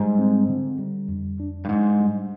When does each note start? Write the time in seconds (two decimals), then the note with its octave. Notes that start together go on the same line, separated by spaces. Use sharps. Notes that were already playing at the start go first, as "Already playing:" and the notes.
Already playing: G#2 G3
0.19 C4
0.49 D3
0.79 G3
1.09 F2
1.40 D4
1.65 G2
1.69 G#2 D4
2.00 G3